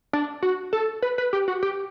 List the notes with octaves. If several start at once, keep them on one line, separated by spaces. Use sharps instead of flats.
D4
F#4
A4
B4
B4
G4
F#4
G4